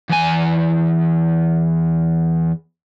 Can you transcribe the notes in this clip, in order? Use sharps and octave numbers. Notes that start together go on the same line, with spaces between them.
E2 G#5